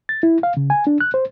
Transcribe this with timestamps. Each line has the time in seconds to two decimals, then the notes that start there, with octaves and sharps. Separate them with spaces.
0.09 A6
0.23 E4
0.43 F5
0.57 C#3
0.70 G#5
0.87 D4
1.01 F#6
1.14 C5